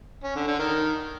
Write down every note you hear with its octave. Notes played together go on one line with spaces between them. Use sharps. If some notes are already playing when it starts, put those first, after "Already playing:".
C#4
D3
D3
D#3